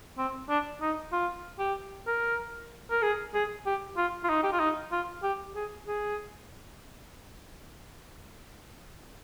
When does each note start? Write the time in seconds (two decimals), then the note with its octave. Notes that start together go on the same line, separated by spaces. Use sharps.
0.18 C4
0.49 D4
0.81 D#4
1.12 F4
1.59 G4
2.07 A#4
2.91 A#4
3.02 G#4
3.34 G#4
3.66 G4
3.97 F4
4.24 F4
4.29 D#4
4.43 G4
4.52 F4
4.60 D#4
4.92 F4
5.23 G4
5.56 G#4
5.87 G#4